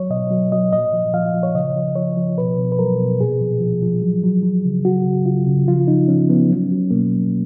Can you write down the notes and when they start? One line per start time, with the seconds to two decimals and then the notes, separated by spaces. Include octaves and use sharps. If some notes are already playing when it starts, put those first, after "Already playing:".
Already playing: F#3 C#5
0.10 B2 D#5
0.31 F#3
0.52 F#3 D#5
0.73 A#2 D#5
0.93 F3
1.14 F3 F5
1.34 F3
1.43 C#5
1.55 C#3 D#5
1.76 F3
1.96 F3 C#5
2.17 F3
2.38 B2 B4
2.58 B2
2.72 B4
2.79 F#3 A#4
3.00 B2
3.21 A#2 G#4
3.41 F3
3.61 F3
3.82 F3
4.02 F#3
4.24 F#3
4.43 F#3
4.65 C#3
4.85 F#3 F#4
5.06 C#3
5.26 C#3 F4
5.47 C#3
5.67 F3 F4
5.88 F3 D#4
6.08 F3 C#4
6.30 F3 B3
6.50 F#3 C#4
6.71 F#3
6.91 B2 A#3
7.11 F#3